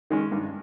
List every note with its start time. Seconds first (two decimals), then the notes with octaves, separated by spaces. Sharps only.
0.10 D#3 G#3 C#4
0.32 G2